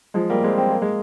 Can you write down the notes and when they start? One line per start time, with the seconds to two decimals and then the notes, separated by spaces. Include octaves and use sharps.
0.14 F3 G#3
0.30 G3 A#3
0.44 G#3 C4
0.58 C4
0.70 A#3
0.82 G#3